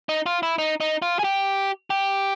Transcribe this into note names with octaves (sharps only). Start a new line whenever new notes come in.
D#4
F4
E4
D#4
D#4
F4
G#4
G4
G4